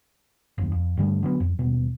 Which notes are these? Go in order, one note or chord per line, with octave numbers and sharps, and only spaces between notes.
F#1 D#2
F2
G2 D3 G3 A3
D3 F#3 B3
F2
D#1 B2